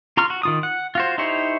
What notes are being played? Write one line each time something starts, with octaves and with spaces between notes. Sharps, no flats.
F4 A#5 C6 C#6 F6
F#4
D#3 F4 D#6
F#5
F4 F#4 C5
D#4 E4 G4 C5 C#5